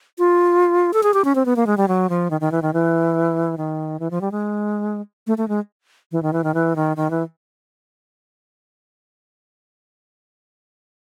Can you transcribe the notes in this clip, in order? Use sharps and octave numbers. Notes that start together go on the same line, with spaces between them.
F4
A4
G#4
G4
C#4
C4
B3
A#3
G#3
G3
F#3
F3
D#3
D#3
E3
D#3
E3
D#3
E3
F3
G3
G#3
A3
A3
G#3
E3
D#3
E3
D#3
E3
D#3
D#3
E3